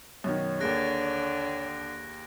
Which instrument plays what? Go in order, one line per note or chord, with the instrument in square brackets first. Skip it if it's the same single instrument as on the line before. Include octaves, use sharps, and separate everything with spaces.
[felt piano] F#2 B2 D#3 [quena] C#5
[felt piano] D#2 A#3 G#4 [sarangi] D3 [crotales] F#6 A#6 D7